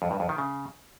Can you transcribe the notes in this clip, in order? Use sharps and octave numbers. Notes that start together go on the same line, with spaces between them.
F2
G2
F2
D#3
C#3